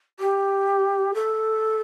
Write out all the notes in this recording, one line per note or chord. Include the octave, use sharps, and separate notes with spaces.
G4
A4